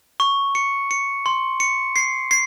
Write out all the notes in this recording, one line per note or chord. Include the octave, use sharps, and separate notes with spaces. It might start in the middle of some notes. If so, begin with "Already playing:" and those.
C#6
C#7
C#7
C6
C#7
C7
C7